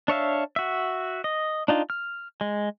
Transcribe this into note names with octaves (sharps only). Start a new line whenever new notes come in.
D4 C#5 E5 F5
F#4 E5
D#5
D4 D#4 F4
F6
G#3